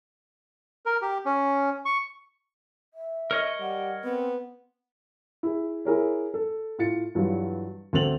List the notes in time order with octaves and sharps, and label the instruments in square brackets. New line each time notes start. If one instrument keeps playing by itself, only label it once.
[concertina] A#4
G4
C#4
C#6
[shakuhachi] E5
[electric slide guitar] A#4 C#5 D#5
[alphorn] G3 [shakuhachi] F#5
[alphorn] B3 [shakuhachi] C4
[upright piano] E4 G#4
E4 G#4 A#4 C#5
A4
A2 F4 A6 C#7
G2 E3 F#3 G3 F4
D2 C4 A4 A6 F7 F#7